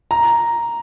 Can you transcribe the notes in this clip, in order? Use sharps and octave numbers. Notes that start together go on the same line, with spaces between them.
A#5